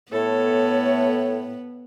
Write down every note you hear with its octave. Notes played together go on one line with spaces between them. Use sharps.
A2 B3 A4 C#5